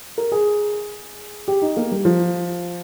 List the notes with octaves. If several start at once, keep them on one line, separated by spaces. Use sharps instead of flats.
A#4
G#4
G4
D#4
A#3
G3
F3